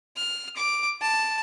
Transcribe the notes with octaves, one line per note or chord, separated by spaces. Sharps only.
F6
D6
A5